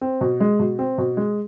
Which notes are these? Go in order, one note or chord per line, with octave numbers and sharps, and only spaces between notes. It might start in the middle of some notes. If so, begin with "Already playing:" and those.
C4
B2
G#3
B2
C4
B2
G#3